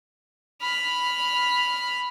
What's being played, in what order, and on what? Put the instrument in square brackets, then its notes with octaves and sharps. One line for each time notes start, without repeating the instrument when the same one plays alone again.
[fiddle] B5 F6